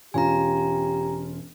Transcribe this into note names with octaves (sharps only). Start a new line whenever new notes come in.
E1 C#4 F4 G4 G#5 A#5